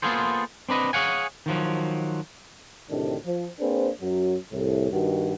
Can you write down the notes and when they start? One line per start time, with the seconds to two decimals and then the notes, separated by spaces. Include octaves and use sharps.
0.02 A#3 B3 F4 G#4 A4 C5
0.69 C4 D4 B4 D#5
0.93 G#4 C#5 F5 F#5 G#5
1.46 D#3 F3 F#3
2.90 D2 A2 C3 D#3 D4
3.25 F3
3.60 A#3 C4 D4 G#4 B4 C5
4.01 F#2 F#3
4.52 C2 A2
4.92 G2 D#3 F#4